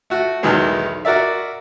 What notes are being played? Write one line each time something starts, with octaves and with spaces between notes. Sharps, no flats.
A3 F#4
B1 E2 D#3 F#3 G#3 B3
F#4 A#4 D5 E5